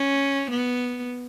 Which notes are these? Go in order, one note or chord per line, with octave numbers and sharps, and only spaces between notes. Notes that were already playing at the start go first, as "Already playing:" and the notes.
Already playing: C#4
B3